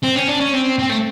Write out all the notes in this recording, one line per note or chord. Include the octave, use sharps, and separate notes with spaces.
C4
C#4
D4
C#4
C4
C4
A3